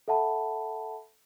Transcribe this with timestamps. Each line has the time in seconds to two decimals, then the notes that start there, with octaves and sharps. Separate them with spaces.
0.08 A4 E5 F#5 A5 B5